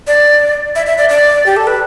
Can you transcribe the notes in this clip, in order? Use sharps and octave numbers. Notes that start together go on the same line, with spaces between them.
D5
E5
E5
D5
D5
G4
A4
B4